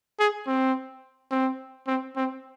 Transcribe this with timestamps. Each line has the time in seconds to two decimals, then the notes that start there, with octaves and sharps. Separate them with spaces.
0.19 G#4
0.47 C4
1.31 C4
1.87 C4
2.16 C4